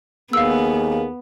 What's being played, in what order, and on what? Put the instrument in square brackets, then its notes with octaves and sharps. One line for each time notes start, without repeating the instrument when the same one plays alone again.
[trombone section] D#2 A#3 G#4 [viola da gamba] B3 [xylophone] F5 E6